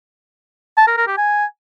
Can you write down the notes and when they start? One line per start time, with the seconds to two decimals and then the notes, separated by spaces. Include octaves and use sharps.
0.77 A5
0.87 A#4
0.97 A#4
1.07 G4
1.18 G#5